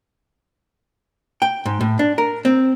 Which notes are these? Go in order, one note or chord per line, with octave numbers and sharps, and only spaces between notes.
G5
G#2
A2
D4
A#4
C4